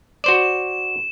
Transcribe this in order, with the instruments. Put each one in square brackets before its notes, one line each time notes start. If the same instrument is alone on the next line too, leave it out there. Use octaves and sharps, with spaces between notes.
[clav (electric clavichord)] F#4 C5 D5 [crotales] E7